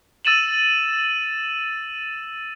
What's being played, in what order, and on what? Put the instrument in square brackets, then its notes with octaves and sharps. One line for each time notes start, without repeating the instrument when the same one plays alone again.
[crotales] E6 A6 D#7 E7 F#7